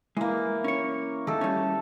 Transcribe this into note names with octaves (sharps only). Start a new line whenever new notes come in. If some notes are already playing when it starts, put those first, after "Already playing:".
E3 G#3 A#3
C#4 C#5
D#3 A3 A4
G3 C#4